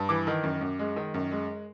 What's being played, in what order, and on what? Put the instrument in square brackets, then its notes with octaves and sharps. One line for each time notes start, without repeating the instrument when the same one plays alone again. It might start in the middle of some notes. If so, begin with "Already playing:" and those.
Already playing: [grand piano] G2
E3 D6
D#3
F#2
F#2
G#3
D#3
F#2
G#3